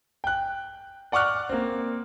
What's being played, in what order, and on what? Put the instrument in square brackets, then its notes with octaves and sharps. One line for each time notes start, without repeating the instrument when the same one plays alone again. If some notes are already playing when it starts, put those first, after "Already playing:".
[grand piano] G5 F#6
D5 F#5 C#6 D6 F6 F#6
A#3 C4